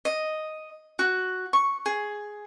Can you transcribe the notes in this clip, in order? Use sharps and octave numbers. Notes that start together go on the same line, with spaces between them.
D#5
F#4
C#6
G#4